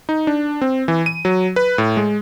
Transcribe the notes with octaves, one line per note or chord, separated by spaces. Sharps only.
D#4
D4
C4
E3
D#7
F#3
B4
A2
G#3